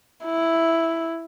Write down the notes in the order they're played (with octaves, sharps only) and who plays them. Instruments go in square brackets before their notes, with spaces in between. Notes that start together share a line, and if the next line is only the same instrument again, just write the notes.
[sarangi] E4